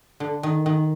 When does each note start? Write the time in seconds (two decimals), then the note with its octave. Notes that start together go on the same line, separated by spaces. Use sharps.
0.20 D3
0.43 D#3
0.66 D#3